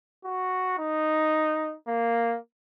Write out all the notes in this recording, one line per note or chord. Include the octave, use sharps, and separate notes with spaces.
F#4
D#4
A#3